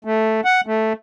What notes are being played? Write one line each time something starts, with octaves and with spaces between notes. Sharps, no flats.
A3
F#5
A3